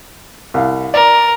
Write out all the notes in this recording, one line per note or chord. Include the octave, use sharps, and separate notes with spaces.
C2 F5
A#4 D5